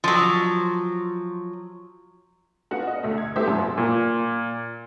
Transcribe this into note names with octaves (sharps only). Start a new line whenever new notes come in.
F3 F#3
B3 F4 F#4 F#5
D#5
D2 A3
G#6
A3 B3 E4 G4 C5 E5
G#1 F#2 F3 F#3 C6
A#2